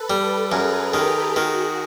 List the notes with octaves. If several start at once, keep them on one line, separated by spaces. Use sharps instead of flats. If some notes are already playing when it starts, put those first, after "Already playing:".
Already playing: A4 B4
G3
F#2 G#4 A#4
D#3 G4 A4
D#3 F#4 G#4